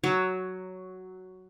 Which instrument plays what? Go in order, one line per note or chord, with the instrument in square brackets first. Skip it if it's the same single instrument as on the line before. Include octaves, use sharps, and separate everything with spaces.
[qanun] F#3